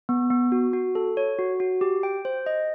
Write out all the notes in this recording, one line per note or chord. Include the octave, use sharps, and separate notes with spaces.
B3
B3
F#4
F#4
A4
C#5
F#4
F#4
G4
G5
C5
D#5